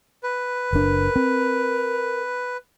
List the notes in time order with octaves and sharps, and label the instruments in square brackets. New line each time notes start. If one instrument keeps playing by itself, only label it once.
[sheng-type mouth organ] B4
[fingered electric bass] F#1 D4 [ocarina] A#4
[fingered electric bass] C4